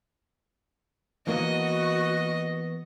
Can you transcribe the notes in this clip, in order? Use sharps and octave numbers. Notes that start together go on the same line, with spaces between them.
E3 A#3 B3 F#4 D#5